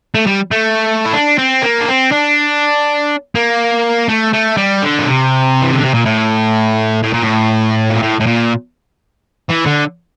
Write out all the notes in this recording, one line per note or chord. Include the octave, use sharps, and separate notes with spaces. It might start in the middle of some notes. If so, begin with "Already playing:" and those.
A3
G3
A3
E4
D4
C4
A#3
D4
C4
D4
A#3
A3
A3
G3
D3
A#2
C3
E3
D3
C3
A#2
A2
A2
A#2
A2
A#2
A2
A2
A#2
E3
D3